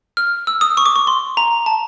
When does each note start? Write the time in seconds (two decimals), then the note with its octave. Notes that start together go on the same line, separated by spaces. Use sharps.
0.17 F6
0.47 E6
0.61 D#6
0.77 C#6
0.86 D6
0.96 C#6
1.07 C6
1.37 A#5
1.66 A5